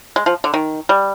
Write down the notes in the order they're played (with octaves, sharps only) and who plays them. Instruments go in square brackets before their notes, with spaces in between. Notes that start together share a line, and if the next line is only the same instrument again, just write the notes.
[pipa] G#3
F3
D3
D#3
G3